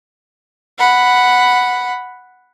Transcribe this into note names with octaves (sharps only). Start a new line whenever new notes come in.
F#5 B5